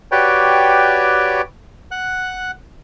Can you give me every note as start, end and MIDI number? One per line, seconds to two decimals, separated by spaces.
0.12 1.42 66
0.12 1.42 67
0.12 1.42 71
0.12 1.42 73
0.12 1.42 74
0.12 1.42 79
1.91 2.51 78
1.91 2.51 90